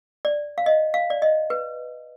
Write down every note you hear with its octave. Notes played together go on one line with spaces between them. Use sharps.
D5
F5
D#5
F5
D5
D#5
B4